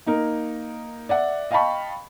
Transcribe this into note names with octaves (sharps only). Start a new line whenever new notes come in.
A#3 D#4 A#4
D5 E5 F#5
D#5 F5 G5 A5 B5 C#6